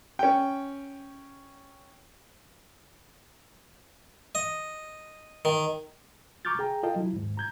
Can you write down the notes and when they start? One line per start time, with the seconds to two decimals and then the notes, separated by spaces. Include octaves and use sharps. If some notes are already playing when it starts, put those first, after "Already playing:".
0.19 C#4 G5
4.35 D#5
5.45 D#3
6.45 A#5 C#6 D6 F6 G6 A6
6.59 G#4 G5 A#5
6.83 F4 A4 D#5 F5 G5 A5
6.96 F#3 E4
7.13 D#2 G#2
7.37 A#5 G6 G#6